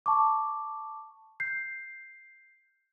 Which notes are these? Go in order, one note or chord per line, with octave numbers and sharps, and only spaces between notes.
A5 C#6 D6
G6 C7